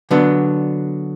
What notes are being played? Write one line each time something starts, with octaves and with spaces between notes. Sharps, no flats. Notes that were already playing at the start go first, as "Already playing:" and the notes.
D3 F#3 B3 D4